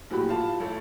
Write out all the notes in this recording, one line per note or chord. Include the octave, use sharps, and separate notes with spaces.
A#1 A2 F#3 F#4 G4 B5
F4 A5
A1 A3